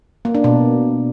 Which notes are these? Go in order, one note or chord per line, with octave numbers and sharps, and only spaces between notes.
A#3
D4
B2